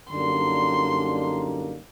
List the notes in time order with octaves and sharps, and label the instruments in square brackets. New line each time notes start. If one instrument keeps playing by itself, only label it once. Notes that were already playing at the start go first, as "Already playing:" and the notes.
[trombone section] F#2 D3 G3 A#3 D#4 [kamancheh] C6